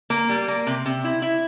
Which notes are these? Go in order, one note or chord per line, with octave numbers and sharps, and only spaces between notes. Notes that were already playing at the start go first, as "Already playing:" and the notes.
A#3
G3
A#3
C3
C3
E4
E4